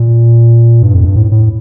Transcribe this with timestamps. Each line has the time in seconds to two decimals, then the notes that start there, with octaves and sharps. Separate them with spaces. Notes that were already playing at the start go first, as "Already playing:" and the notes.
Already playing: A#2
0.83 G2
0.94 F2
1.05 G2
1.16 A2
1.31 A2